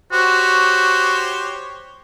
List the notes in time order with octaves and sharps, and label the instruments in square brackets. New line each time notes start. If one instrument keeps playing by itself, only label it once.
[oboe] F#4 [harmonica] G4 C5 C#5